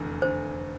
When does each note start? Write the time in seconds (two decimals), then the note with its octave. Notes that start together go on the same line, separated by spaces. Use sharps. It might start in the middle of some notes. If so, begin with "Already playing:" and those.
Already playing: F1 E2 D3
0.22 D3 C5